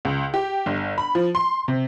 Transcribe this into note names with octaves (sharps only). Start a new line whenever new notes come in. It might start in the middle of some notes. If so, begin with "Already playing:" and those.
C#2
G4
G1
B5
F3
C6
C3